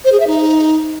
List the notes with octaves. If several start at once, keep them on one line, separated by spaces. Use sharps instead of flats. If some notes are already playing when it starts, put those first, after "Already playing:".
C5
G#4
E5
D#4